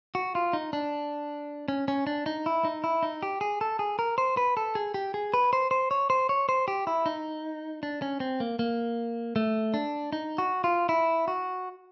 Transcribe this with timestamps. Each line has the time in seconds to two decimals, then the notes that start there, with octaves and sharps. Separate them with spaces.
0.15 F#4
0.35 F4
0.53 D#4
0.73 D4
1.68 C#4
1.88 C#4
2.07 D4
2.26 D#4
2.46 E4
2.65 D#4
2.84 E4
3.03 D#4
3.23 G4
3.41 G#4
3.61 A4
3.79 G#4
3.99 A#4
4.18 C5
4.37 B4
4.57 A4
4.75 G#4
4.94 G4
5.14 G#4
5.34 B4
5.53 C5
5.71 C5
5.91 C#5
6.10 C5
6.29 C#5
6.49 C5
6.68 G4
6.87 E4
7.06 D#4
7.83 D4
8.02 C#4
8.20 C4
8.40 A#3
8.59 A#3
9.36 A3
9.74 D4
10.13 D#4
10.38 F#4
10.64 F4
10.89 E4
11.28 F#4